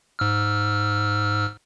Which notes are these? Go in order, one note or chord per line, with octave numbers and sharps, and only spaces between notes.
G#2 E6 F6